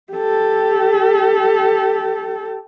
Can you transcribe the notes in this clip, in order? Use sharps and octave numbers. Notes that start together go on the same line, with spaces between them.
G4 A4